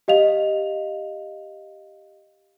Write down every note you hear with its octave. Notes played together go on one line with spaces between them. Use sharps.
G4 D#5 F5 F7